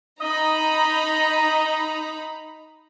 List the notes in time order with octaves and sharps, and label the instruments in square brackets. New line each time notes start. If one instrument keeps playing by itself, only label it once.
[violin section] D#4 A#5 B5 [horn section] D#5